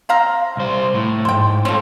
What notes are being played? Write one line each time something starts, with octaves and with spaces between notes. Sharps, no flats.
C4 F5 A#5
C2 C5
A2
F2 G#2 C5 G5
C4 C#4 F4 A4